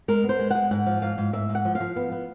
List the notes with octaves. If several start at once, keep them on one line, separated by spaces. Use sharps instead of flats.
G#3 A#4
B3
C5
G#3
G#3 F#5
G#2 F#5
F3
G#2 F5
G#2
G#2 E5
G#2
F#5
F3
F5
F3
B3
B3